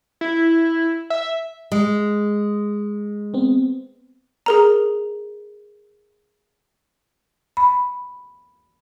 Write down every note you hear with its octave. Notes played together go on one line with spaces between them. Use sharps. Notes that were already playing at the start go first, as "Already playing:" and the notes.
E4
E5
G#3
B3 C4
G#4 A#4 A#5
B5